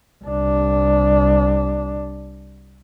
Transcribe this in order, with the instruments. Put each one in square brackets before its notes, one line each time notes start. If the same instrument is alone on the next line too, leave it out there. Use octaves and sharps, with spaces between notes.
[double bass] C2 D4